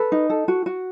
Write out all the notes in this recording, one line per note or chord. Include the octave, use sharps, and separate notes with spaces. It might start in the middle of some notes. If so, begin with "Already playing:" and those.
Already playing: A4 B4
D#4
A4
F#4
F#4